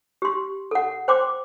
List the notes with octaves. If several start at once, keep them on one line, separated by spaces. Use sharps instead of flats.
G4 C6
A4 F#5
C5 G5 C6 D6